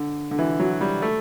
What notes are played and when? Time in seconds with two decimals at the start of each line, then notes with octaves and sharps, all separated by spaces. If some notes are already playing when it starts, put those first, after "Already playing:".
Already playing: D3
0.31 D3
0.39 E3
0.60 F#3
0.81 G3
1.02 A3